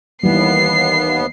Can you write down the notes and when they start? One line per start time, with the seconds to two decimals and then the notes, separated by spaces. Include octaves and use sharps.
0.23 D#2 E3 G3 B3 C7